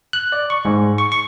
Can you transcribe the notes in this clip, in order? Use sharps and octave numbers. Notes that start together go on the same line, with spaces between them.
F#6
D5
C#6
G#2
C#6
C#6